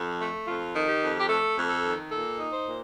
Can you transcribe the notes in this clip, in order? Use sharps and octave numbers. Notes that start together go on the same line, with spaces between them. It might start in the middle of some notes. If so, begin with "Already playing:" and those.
Already playing: F2
A3
F2 F4
D#3
G4
F2
G4
A3 A4
F2
A4
D#3
A#2 A4
D#4
C5
A#2